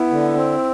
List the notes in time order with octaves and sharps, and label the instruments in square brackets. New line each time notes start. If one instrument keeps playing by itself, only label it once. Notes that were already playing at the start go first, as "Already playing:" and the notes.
Already playing: [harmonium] B3 [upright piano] E4
[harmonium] D3
C4